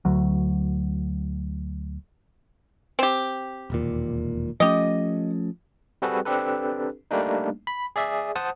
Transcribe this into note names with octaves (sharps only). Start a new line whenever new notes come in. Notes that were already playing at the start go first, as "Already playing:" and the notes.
D2 F#3
C4 G4
E1 D#2 A#2
F3 A3 C#4 G4 D#5
G3 C4 F#4 G#4 A4 B4
C4 D4 G4 A4 B4
G3 A3 A#3 D4 D#4
B5
G#4 D5 E5
C5 F#5 A5 D#6